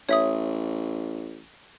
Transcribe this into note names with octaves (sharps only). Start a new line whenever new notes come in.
A1 C#5 E5 D#6